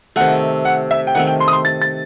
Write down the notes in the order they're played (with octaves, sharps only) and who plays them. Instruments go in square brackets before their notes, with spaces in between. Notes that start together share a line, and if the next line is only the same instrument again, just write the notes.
[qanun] C3 D#3 A3 [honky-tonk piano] F#5
[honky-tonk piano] F#5
E5
G5
[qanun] D#3 A3 C4 [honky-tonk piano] F#5
[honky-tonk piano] G5
C6
D#6
C6
A6
A6